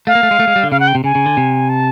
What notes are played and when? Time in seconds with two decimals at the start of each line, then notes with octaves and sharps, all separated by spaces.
0.07 A3 F5
0.15 A#3
0.23 A3
0.31 G#3
0.40 A3
0.47 G#3
0.56 G3
0.63 D3
0.72 C#3 F5
0.80 F#5
0.87 G5
0.95 C3
1.04 C#3 G#5
1.15 C#3
1.26 D3
1.37 C3
1.69 A5